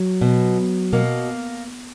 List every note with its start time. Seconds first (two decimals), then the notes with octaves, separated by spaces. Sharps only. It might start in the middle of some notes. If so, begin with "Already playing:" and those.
Already playing: F#3
0.21 B2
0.93 B2 A#3